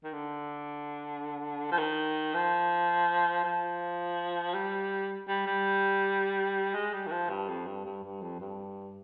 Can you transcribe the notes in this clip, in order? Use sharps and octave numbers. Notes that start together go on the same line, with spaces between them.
D#3
D3
F3
D#3
F3
F3
G3
G3
G3
G#3
G3
D#3
F3
G2
F2
G2
G2
G2
F2
G2